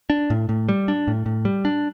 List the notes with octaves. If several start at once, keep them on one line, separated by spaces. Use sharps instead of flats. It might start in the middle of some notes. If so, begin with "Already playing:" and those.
D4
A2
A2
G3
D4
A2
A2
G3
D4